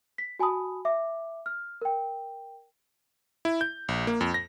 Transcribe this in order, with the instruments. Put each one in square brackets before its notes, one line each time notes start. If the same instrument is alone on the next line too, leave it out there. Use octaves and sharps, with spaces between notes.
[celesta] B6
F#4 G#5 A5 B5 D#6
E5 D6
F6
A#4 G5
[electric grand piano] E4
G6
A#1
A#3
F2
A#6